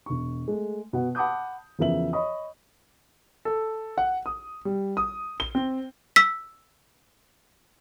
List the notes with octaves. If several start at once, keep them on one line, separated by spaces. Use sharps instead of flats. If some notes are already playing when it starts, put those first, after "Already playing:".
E1 C#6
G#3 A3
B2 F#5
F#5 A5 B5 D6 D#6 G6
E2 C#3 F3 A#4 E5 F#7
C#5 D#5 B5 C#6 D#6
A4
F#5
D#6
G3
D#6
G7
C4
E6 B6